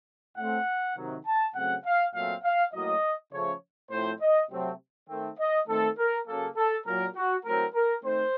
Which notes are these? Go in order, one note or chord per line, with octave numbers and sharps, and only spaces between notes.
A2 A3 C4 F#5
C3 D#3 F#3
A5
C#3 F#3 A3 C4 F#5
F5
A#2 F#3 A3 C4 F5
F5
A2 F#3 A#3 D#5
C#3 F3 A3 C#5
A2 F3 C4 C5
D#5
C3 F#3 A3 C4
D#3 A3 C4
D#5
D#3 A3 C4 A4
A#4
C#3 F#3 A#3 A4
A4
A#2 F#3 A#3 A#4
F#4
A2 F#3 C4 A#4
A#4
D#3 A3 C4 C5